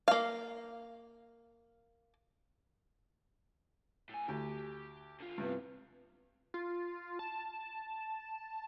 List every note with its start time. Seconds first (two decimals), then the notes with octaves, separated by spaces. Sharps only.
0.08 A#3 F5
4.10 A2 G#5
4.28 D2 G4
5.20 D3 F4
5.38 G2 C3 B3
6.54 F4
7.19 A5